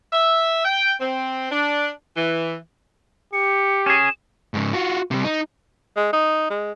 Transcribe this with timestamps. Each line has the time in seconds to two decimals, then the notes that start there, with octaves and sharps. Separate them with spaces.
0.13 E5
0.65 G5
1.01 C4
1.51 D4
2.16 E3
3.33 G4 C#7
3.86 C#4 G#4 E7
4.54 G#2 C#3
4.73 F4 F#4
5.11 C3 G3
5.24 D#4
5.96 G#3
6.13 D#4
6.50 G#3